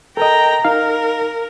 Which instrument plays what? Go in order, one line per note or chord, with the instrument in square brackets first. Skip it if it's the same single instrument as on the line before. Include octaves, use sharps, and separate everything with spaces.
[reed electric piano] A4 A#4 D#5 [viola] G5 A#5
[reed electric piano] D#4 F5 [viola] A#4